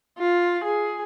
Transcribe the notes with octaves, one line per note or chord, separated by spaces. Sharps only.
F4
G#4